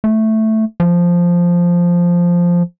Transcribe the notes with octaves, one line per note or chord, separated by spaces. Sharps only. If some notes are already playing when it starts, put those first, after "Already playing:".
A3
F3